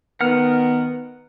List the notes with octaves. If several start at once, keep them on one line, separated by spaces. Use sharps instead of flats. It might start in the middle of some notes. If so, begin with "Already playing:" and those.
D#3 B3 A#4 F#5 F6